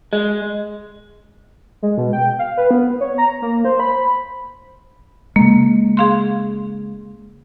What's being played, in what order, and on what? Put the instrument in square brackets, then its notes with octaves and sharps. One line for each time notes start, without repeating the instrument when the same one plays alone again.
[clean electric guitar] G#3
[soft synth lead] G#3
B2
G5
F5
B4
B3
C#5
A#5
A#3
C5
B5
[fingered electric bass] C#3 G#3 [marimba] A#3
[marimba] G#4 F5 C6